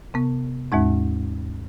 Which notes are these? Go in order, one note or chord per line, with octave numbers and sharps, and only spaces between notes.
C3 B3
D#2 G#2 G#3 D#4